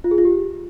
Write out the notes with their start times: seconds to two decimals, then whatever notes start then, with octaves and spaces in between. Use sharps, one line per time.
0.04 F4
0.11 G#4
0.18 F4
0.25 G4